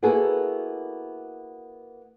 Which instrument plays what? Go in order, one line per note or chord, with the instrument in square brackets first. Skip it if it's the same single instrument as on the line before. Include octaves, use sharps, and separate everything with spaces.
[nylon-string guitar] A#3 B3 E4 F#4 G#4 A4